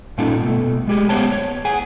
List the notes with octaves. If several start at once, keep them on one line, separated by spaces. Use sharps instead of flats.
G2 A#2 C#4 D#4 F4 A4
B2 A3
G#3 G4 G#4
B3 G4 C5 C#5 A5
C#5
G#4 F#5 G#5